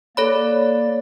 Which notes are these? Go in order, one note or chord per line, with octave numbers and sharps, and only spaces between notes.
A#3 A4 C#5 D5 B5